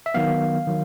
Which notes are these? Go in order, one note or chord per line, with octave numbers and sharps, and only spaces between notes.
E5
D#3 F#3 B3 F5
D#3 F#3